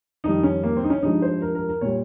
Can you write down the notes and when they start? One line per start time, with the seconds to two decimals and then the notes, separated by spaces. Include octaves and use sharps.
0.24 F2 D#3 G3 D#4
0.43 C#4
0.63 A#3
0.77 C4
0.84 D#4
0.90 C#4
1.03 G2 F3 G#3 D#4
1.22 C5
1.42 A#4
1.55 A#4
1.69 A#4
1.81 A#2 G3 C#5